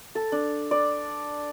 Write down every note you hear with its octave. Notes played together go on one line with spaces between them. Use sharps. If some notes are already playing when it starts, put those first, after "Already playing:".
A4
D4
D5